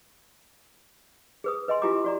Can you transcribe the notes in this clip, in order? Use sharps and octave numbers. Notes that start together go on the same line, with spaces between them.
G#4 B4 D#6
B4 D#5 G#5 C6
E4 F4 G4 G#5 A#5 D6
F#4 D5 A#5